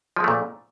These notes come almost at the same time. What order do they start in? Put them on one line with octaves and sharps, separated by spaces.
F3 G#3 A3 A#2